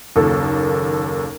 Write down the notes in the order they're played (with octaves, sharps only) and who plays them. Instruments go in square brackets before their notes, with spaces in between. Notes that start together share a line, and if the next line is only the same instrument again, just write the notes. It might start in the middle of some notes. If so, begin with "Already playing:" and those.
[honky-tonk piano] F#1 D#2 A#3 A4